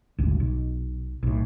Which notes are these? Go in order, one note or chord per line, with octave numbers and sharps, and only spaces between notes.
D#1 G#1 D2
B1
B1 A2